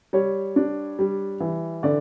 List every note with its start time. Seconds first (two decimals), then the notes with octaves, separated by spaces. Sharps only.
0.13 G3 C#5
0.56 D4
0.99 G3
1.40 E3
1.83 D3 D5